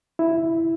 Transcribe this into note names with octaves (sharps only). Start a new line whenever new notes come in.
E4